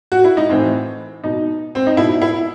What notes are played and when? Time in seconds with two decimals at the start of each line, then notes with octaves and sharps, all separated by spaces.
0.12 F#4
0.24 E4
0.37 D#4
0.50 A2 E3 C4
1.24 B2 D#4
1.75 C4
1.87 D#4
1.97 B2 E4
2.22 E4